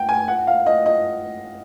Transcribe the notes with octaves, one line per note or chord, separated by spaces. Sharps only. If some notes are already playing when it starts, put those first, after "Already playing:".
Already playing: F#5 G5
G#5
F#5
F5
D#5
D#5